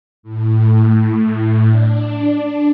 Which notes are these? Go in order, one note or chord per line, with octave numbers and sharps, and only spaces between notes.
A2
D4